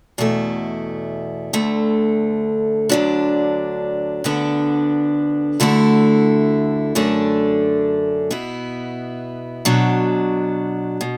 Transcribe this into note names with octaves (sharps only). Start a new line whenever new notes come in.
E2 B2 A3 E4
D2 D3 A3
D2 D3 F#3 D4
D2 D3 B3 D4
D2 D3 A3 E4
F#2 D3 A3 D4
B2 B3 E4
B2 F#3 D4
B2